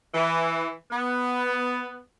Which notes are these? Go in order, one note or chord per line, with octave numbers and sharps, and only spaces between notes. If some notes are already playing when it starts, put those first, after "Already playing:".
E3
B3